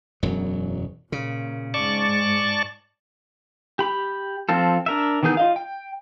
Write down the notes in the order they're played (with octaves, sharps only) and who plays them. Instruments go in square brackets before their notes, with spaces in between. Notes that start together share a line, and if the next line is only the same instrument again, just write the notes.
[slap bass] E1 F#2 F#3
[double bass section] A#2 [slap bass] C#3
[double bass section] G#2 G#3 [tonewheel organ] D5 A5 C#6
[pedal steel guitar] G4 B5
F3 C4 F4 A4
D4 A#4 E5
D#3 E3 B3 G#4 G6
F4 D#5 F5
G5